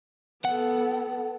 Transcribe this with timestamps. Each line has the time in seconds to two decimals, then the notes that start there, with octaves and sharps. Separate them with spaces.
0.45 B3 A4 F#5